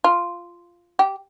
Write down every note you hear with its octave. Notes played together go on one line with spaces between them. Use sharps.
F4
G4